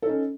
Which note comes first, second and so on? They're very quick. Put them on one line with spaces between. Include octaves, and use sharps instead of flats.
A4 D#4 C#4